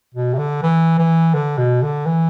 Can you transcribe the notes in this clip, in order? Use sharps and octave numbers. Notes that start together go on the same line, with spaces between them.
B2
C3
D3
E3
E3
D3
B2
D3
E3